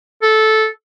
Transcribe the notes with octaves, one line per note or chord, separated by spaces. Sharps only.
A4